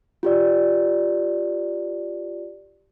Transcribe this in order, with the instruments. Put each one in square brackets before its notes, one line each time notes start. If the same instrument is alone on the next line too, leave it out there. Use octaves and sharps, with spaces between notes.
[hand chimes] F4 G4 D5